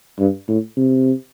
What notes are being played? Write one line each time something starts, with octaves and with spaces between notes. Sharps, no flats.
G2
A2
C3